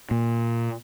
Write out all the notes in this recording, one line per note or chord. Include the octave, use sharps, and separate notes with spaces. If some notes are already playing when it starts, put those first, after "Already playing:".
A#2